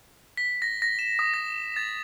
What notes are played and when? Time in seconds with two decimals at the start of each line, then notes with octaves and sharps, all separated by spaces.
0.37 B6
0.62 A#6
0.82 A#6
0.99 E7
1.19 D#6
1.34 A#6
1.76 A6